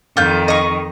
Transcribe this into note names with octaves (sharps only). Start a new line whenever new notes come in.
F2 D#3 F4 G6
D#5 C#6